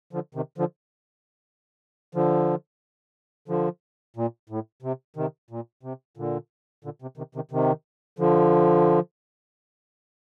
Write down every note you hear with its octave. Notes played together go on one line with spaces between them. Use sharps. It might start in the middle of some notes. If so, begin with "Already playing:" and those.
D3 F3
C3 D#3
D3 F3
D3 F3
D3 F3
A#2
A2
C3
C3 D#3
A#2
C3
A#2 D3
A#2 D3
C3
C3 D#3
C3 D#3
C3 D#3
D3 F3